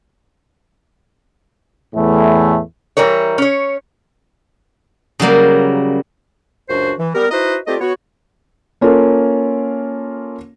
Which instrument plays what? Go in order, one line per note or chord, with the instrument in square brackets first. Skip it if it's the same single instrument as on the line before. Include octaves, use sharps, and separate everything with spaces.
[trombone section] E2 A2 E3 A3
[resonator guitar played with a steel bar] E3 G3 A#4 C#5
C#4 C#5
[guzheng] C#3 F#3 G3 A#3
[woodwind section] C#2 F#2 D4 F#4 C5
E3
G3 B3 A#4
D#4 E4 F#4 B4 C5 D#5
A3 C4 F4 G4 D5 D#5
B3 F#4 C#5
[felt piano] A#3 C#4 F4 A4 A#4